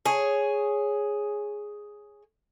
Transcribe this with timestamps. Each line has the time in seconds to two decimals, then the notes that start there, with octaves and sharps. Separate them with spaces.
0.06 G#4 C#5